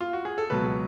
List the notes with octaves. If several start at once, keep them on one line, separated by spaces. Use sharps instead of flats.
F4
F#4
G#4
A4
C#2 B2 F#3 B4